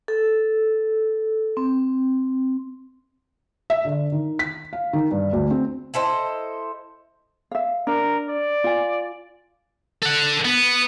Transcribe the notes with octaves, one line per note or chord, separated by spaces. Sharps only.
A4
C4
E5
D3
D#3
B6
F5
D#3
G2
D2
C4
E4 A4 C5 D#5
E5 F5
D4 A#4
D5
F4 G#5
A4 F#5
B3